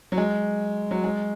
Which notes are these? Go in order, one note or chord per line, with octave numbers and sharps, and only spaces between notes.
F#3
G#3
F#3
G#3